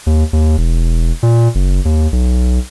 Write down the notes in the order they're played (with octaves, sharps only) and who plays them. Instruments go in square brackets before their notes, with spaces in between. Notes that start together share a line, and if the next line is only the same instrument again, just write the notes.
[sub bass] D#2
D#2
E1
A#2
F#1
D#2
B1